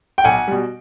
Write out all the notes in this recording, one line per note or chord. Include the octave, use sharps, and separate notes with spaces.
G5
B1 F#5 G#5
B2 G3